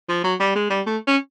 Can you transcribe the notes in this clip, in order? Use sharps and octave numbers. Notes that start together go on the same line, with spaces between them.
F3
F#3
G3
G#3
G3
A3
C#4